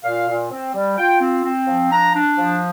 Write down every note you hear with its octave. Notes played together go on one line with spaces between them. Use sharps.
A#2 F5
A#2
C4
G3
F4 G5
C4
C4
F3
D4 A#5
D4
F3